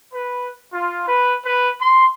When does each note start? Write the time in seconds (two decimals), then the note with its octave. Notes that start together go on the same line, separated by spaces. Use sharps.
0.13 B4
0.73 F4
1.08 B4
1.45 B4
1.80 C6